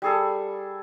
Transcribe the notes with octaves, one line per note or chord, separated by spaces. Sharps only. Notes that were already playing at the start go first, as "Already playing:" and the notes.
G3 G#4 A4